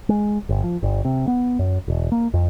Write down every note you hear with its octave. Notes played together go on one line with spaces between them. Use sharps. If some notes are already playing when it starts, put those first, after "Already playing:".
G#3
G1
F3
G1
C3
B3
F#2
E1
A#3
F2